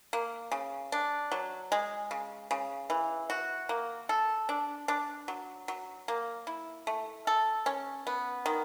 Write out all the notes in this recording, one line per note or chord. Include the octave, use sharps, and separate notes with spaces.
A#3
C#3
D4
F#3
G#3
C#3
C#3
E3
F#4
A#3
A4
D4
D4
F#3
F#3
A#3
E4
A3
A4
C#4
B3
D#3